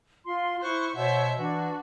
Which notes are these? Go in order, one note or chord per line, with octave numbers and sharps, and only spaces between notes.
F4 C6
E4 C5 C#6 F#6
B2 C5 C#5 E5 F#5
E3 D4 F#4